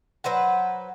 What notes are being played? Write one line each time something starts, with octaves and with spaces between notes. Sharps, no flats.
F#3 B4 C5 F#5